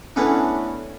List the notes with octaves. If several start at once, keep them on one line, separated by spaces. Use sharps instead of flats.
E3 A3 B3 C#4 D4